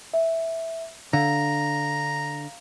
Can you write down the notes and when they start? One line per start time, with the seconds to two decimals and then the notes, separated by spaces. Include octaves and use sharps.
0.14 E5
1.13 D3 F5 A#5